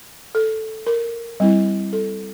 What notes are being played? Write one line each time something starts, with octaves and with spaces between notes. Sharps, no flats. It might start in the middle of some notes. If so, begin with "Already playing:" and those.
A4
A#4
G3 C4 E4
A4